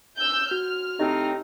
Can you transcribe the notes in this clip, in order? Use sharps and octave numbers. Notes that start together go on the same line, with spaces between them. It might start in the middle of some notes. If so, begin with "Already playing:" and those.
E6 G6
F#4 F6
A2 C4 D#4 G4 D#5